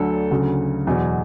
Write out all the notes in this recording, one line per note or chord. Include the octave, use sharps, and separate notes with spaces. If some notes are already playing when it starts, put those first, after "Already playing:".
Already playing: D2 D3 F#3 A4
D2 C#3 F#3
E2 B2 F#3